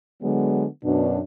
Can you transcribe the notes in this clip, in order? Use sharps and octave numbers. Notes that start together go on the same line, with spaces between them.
D3 F#3 G#3 B3
F#2 B2 D4